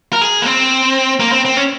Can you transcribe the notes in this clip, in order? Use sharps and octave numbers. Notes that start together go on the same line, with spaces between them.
A#4
G#4
A#3
C4
A#3
C4
C4
C#4